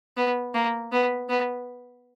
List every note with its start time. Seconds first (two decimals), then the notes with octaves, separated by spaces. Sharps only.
0.17 B3
0.54 A#3
0.92 B3
1.29 B3